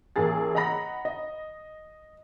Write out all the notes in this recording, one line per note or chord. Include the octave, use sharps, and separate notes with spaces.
A1 A#3 G#4 A6
D#5 F#5 A#5 B5 A#6
D#5